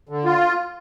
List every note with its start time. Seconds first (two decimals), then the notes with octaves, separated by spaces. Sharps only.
0.09 D3
0.25 F4